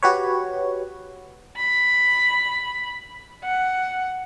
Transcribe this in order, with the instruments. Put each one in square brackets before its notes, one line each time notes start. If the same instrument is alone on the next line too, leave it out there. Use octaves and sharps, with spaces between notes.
[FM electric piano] F#4 G4 B4 C#5
[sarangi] B5
F#5